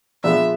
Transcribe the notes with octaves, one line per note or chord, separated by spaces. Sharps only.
A#2 F3 G#3 B3 D4 E5